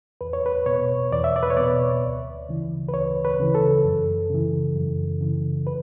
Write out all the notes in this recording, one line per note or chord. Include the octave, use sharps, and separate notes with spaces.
E2 B4
C#5
B4
B2 C#5
E2 D5
E5
D5
B4
C#5
B2 D5
D2
C#3 E3
B4
D2 C#5
B4
C#3 E3
A4
F#2
C#3 E3
F#2
C#3 E3
B4